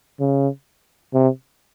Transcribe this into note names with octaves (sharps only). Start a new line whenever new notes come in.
C#3
C3